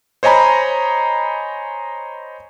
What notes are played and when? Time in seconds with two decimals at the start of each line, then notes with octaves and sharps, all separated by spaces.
0.23 C5 C#5 D#5 G#5 A#5 B5